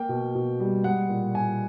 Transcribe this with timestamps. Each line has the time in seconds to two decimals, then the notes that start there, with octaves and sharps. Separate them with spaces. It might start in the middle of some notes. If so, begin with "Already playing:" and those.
Already playing: A#3 G5
0.09 B2
0.35 B2
0.60 G3
0.84 G#3 F#5
1.09 A#2
1.35 A#2 G#5